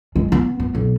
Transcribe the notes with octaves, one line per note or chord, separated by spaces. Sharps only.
G#3
B3
B3
B1